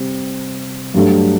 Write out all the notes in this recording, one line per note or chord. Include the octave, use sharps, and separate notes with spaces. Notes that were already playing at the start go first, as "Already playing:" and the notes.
Already playing: C3 G3 C4
G2 F#3 A3 D4 G4